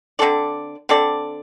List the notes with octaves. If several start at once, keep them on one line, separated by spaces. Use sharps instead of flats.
D3 C4 A4 D5
D3 C4 A4 D5